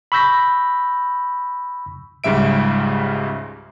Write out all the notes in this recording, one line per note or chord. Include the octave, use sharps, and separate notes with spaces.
B5 C#6 E6 G6 A#6 B6
C#2 G#2 C#3 G3 E5 D7